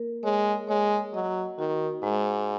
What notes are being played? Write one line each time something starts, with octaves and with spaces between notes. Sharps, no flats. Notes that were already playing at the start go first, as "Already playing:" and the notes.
Already playing: A#3 A#4
G#3 C#5
G#3 C#5
F#3 D#5
D#3 F#4
G#2 G#3